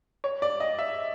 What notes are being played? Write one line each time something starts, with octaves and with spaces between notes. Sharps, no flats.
C#5
D5
D#5
E5